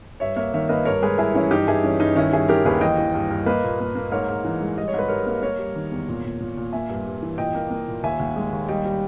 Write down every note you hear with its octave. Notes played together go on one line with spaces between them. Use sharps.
G2 C#5 E5
A#3 C#5 E5
D#3 C#5 E5
A#3 B4 D#5
G2 A#4 C#5
G#3 G#4 B4
G2 E4 G#4
E3 C#4 E4
G2 D#4 G4
G2 E4 G#4
E3 C#4
G2 D#4
D#3 C#4 E4
G3 E4 G#4
D#3 G4 A#4
D#2 G#4 B4
E3 D#5 G5
E3
G2
G2
A#3 B4 D#5
A#2
A#3
A#3
G#2 A#4 C#5
G#2
E3
G#3
G3 D#5
C#5
G#2 B4
G3 A#4 C#5
A#3
A#3 A#4 C#5
G3
D#3
E2
A#2
A#2
A#2
A#2
A#3 E5 G#5
G2
G2
E3
A#2 D#5 G5
A#3
A#3
A#2
D#2 E5 G#5
D#2
G#3
D#2
G3 D#5 G5
G3